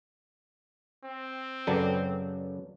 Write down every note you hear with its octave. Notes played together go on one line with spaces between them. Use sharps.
C4
F#2 C#3 F#3 A4 B4 D5